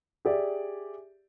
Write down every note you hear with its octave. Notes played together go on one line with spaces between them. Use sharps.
G4 G#4 D5 E5